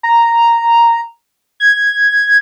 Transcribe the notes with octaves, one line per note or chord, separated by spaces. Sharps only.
A#5
G#6